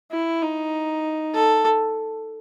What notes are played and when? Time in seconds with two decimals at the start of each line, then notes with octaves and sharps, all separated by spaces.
0.12 E4
0.43 D#4
1.34 A4